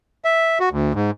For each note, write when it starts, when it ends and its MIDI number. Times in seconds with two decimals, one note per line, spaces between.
0.25 0.58 76
0.60 0.69 66
0.71 0.93 38
0.94 1.11 44